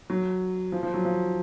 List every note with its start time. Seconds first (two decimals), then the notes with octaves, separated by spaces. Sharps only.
0.10 F#3
0.72 F3
0.83 F3
0.94 F#3
1.05 F3